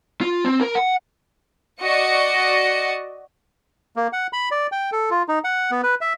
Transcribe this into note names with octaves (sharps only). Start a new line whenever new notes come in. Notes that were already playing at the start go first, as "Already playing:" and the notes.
F4
C4
A#4
F#5
F#4 D5 D#5 C#7
A#3
F#5
B5
D5
G5
A4
F4
D#4
F#5
B3
B4
E5